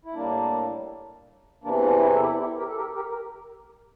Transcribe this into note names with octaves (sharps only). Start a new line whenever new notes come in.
E4
A2 G3 A#3 D4
E2 C3 E3 A#3 D4
A#3 D4
C4 E4
A4
E4 G4
E4 G4
G4 A#4
A4
G4 A#4
G4 A#4
A#4